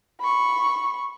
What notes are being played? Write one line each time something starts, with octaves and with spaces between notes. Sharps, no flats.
B5 C#6